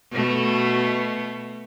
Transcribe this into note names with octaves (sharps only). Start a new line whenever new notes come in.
B2 A3